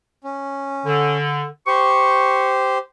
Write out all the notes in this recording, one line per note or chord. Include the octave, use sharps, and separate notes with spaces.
C#4
D3
G4 C5 C#6